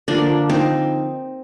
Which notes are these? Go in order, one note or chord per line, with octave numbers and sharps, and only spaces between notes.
D3 F3 A#3 D4
C4 D#4